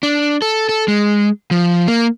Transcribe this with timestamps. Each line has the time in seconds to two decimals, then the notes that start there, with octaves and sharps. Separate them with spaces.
0.03 D4
0.42 A4
0.69 A4
0.88 G#3
1.51 F3
1.88 A#3